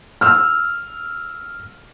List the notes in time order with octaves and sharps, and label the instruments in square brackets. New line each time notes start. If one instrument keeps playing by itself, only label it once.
[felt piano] E6 F6